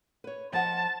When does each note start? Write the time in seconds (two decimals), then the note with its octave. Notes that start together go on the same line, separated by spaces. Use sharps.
0.24 B4 C#5
0.53 F3 D#5 F#5 A5